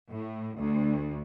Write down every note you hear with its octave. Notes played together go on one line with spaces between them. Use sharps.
A2
D2